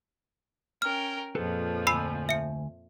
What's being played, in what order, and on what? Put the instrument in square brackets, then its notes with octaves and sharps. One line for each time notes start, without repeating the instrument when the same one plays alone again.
[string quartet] C#4 A#4 G5 [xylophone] F6
[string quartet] F2 A#2 F3 [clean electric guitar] G#4 A4 B4
[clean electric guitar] D2 G#5 [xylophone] B5 E6 C7
[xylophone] E5 C#7